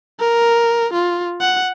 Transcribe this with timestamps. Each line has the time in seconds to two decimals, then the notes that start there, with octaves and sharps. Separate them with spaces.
0.20 A#4
0.93 F4
1.41 F#5